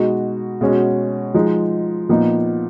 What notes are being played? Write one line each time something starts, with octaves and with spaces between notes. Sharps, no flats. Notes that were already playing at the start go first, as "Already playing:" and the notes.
Already playing: B2 G#3 D#4 F#4
B2 G#3 C#4 F#4
F3 G#3 D#4
A#2 F3 B3 D#4